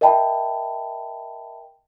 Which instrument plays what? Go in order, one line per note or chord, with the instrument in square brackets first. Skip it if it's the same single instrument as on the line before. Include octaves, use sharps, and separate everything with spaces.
[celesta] A#4 D#5 E5 G5 A5 B5